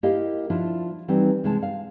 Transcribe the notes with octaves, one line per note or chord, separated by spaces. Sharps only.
A#3 E4 G4 A#4 D#5 F5
F3 D4 E4 F4
E3 G3 C4 D#4
C3 E3 G#3 C#4 A5
F5